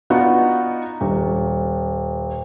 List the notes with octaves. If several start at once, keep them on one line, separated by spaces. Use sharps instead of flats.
B3 D4 D#4 F4 F#4
D#1